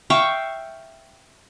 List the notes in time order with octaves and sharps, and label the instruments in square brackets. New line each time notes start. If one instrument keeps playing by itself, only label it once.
[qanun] E5 F5 G5 C#6